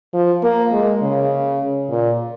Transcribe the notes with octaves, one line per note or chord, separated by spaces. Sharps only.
F3
A#3
G#3
C#3
A#2